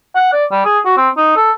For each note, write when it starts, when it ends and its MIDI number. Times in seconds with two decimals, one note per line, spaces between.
0.15 0.32 78
0.33 0.45 74
0.51 0.63 55
0.65 0.80 68
0.85 0.96 66
0.97 1.09 60
1.17 1.35 63
1.37 1.52 69